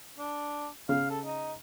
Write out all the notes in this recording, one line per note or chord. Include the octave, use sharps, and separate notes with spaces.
D4
C#3 F5
A4
D#4